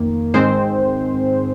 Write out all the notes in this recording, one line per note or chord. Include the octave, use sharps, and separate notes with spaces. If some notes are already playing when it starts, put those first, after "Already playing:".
Already playing: F2 D#3 A#3
G#2 D#3 G#3 C4 C5